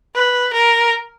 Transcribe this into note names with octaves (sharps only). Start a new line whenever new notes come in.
B4
A#4